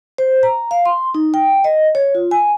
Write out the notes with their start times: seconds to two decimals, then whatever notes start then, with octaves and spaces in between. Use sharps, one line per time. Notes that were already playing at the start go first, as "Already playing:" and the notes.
0.18 C5
0.43 A#5
0.71 F5
0.86 C6
1.15 D#4
1.34 G5
1.64 D#5
1.95 C#5
2.15 F4
2.31 G#5